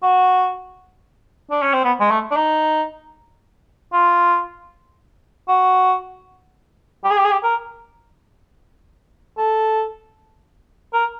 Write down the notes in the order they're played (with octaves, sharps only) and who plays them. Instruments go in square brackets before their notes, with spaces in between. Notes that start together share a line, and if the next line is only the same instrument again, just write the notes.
[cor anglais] F#4
D4
C#4
C4
B3
G#3
A3
D4
D#4
F4
F#4
G4
G#4
G4
G#4
G4
A#4
A4
A#4